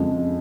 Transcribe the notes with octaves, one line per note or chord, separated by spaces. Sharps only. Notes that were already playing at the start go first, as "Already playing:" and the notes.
Already playing: F2 C#3 G#3